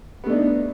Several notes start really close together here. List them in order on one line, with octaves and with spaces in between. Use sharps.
B3 A3 D4 D#4